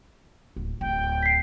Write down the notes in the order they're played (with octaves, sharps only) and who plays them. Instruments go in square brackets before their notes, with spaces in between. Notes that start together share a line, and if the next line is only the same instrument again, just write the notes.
[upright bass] D1
[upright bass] D1 [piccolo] G5
[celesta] B6 C7